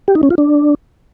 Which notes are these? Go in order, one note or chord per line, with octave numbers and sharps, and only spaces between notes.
G4
D#4
C#4
F4
D4